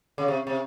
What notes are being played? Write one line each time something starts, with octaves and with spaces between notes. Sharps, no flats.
C#3
C3
C3